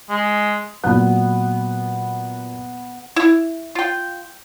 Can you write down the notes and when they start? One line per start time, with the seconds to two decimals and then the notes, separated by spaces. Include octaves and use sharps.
0.09 G#3
0.84 A#2 F#3 B3 F#6
3.16 E4
3.75 F4 G5